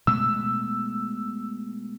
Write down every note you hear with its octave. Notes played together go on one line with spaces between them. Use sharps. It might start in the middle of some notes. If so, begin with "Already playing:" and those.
B2 G#3 A3 E6